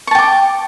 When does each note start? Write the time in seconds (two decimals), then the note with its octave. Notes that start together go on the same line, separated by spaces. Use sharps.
0.07 C#6
0.11 A5
0.15 G5
0.19 D6